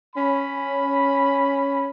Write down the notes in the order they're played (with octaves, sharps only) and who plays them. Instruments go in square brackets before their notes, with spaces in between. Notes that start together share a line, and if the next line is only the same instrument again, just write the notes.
[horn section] C#4 B5